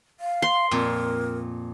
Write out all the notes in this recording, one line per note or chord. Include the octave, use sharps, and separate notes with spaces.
F5
C6
F2 A#2 A#4